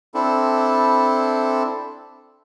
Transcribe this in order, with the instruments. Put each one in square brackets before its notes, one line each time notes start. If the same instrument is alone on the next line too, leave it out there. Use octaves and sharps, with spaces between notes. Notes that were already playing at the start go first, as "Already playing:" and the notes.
[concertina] C4 D4 E4 A4